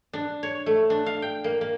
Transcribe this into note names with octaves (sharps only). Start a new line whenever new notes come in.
D4
C#5
A3
D4
F5
G5
A#3
A#3